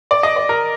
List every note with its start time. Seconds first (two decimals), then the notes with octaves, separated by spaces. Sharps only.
0.11 D5
0.23 D#5
0.36 D5
0.49 A#4